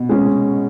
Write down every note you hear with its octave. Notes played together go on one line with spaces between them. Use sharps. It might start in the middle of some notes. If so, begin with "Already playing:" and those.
Already playing: B2
G#3 C#4